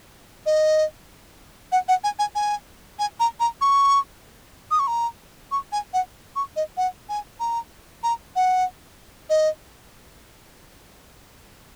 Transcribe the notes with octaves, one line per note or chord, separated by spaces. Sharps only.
D#5
F#5
F#5
G#5
G#5
G#5
G#5
A#5
A#5
C#6
D#6
C#6
A#5
C#6
G#5
F#5
C#6
D#5
F#5
G#5
A#5
A#5
F#5
D#5